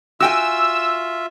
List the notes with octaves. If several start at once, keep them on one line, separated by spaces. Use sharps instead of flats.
F4 F#4 E5 G5 G#5 E6